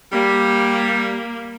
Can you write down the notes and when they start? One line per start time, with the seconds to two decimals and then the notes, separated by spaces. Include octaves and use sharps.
0.13 G3 A#3